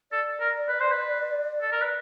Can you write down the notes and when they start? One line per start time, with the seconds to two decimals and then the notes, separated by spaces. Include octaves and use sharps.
0.11 A4 D5
0.40 A#4
0.68 B4
0.80 C5
0.91 B4
1.61 A4
1.72 A#4
1.82 B4